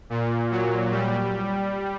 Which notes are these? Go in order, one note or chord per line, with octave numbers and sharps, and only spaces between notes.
A#2
F#3
G3